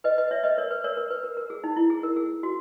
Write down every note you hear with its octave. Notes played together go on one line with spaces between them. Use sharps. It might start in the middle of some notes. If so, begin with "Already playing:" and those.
B4 D#5
B4 D#5
C#5 E5
B4 D#5
A#4 C#5
B4
A#4 C#5
A#4
B4
A#4
A#4
G#4
D#4
E4
G#4
A#4
G#4
F#4